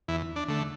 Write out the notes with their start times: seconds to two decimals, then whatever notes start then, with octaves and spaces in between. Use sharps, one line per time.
0.08 E2 E4
0.36 D4
0.48 D3 A3